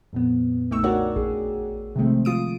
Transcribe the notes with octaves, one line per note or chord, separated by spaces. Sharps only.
F2 A#2 B3
B1 A3 D#4 G5 C#6 E6
D4 F#4 A#4 C#5 D5 F#5
A1 G#4
C3 D#3 F3 G#3 A3 C4
F3 F4 D#6 D7